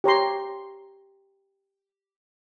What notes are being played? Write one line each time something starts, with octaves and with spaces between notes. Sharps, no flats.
G4 C#5 A#5 C6